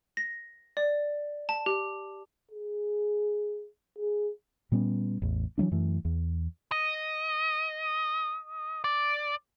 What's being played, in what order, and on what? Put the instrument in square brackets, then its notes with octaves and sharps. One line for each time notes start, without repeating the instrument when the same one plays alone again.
[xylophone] A#6
D5
A5
G4
[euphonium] G#4
G#4
[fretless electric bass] A#2 G3 B3 C#4
A1 E2
E3 F#3 A3 D4
F#2 E3 A3
E2
[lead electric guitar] D#5
D5